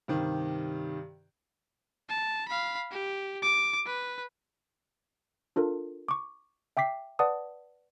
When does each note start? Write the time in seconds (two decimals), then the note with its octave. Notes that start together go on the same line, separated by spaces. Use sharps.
0.08 G2 C3 D#3
2.09 A5
2.48 F5 B5
2.91 G4
3.42 D6
3.86 B4
5.56 D4 F4 A4 A#4
6.08 C#6 D6
6.77 E5 G5 D6 B6 C7
7.19 B4 D5 F#5 A5 D#6